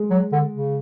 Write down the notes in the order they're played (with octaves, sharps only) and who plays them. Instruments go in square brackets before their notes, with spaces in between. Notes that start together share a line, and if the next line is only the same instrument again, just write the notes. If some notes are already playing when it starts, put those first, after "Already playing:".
Already playing: [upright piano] G#3
[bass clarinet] F#3
D3
C#3